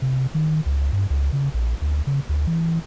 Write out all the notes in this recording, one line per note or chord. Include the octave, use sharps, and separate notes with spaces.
C3
D#3
C#2
G2
C#2
C#3
A#1
D2
C#3
D2
E3